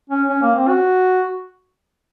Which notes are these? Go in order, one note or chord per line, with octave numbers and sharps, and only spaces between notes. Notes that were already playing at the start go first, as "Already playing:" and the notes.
C#4
C#4
A#3
C4
F#4